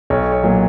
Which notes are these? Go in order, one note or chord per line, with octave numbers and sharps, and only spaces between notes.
B1 C#5
C#5
A#2 F#3